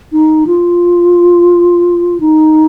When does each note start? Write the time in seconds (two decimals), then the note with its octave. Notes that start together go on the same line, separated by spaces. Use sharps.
0.12 D#4
0.47 F4
2.20 D#4